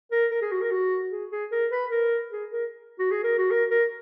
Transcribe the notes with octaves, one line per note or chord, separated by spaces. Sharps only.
A#4
A#4
G#4
F#4
A#4
F#4
G#4
G#4
A#4
B4
A#4
G#4
A#4
F#4
G#4
A#4
F#4
A#4
A#4